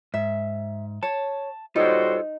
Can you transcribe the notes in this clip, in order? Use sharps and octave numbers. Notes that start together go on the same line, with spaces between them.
G#2 E5
C#5 A5
G3 D#4 F4 F#4 A4 C5 C#5